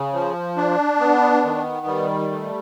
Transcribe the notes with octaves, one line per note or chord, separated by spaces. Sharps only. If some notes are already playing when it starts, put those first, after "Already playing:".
Already playing: C#3
F3
D4
B3
D#3
G3
A3